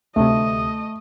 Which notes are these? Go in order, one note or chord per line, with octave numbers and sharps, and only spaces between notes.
D2 C3 A3 D#5